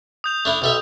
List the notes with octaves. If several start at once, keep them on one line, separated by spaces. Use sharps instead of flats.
D#6 G6 F7
A3 D4 E4
B1 A4 E5